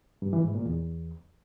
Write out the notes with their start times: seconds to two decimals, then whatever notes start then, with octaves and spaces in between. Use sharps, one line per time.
0.22 G2
0.33 E3
0.44 G#2
0.55 A#2
0.66 E2